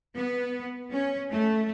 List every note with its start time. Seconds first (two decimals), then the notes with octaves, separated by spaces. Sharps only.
0.16 B3
0.92 C#4
1.32 A3